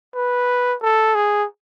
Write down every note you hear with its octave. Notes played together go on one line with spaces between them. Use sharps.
B4
A4
G#4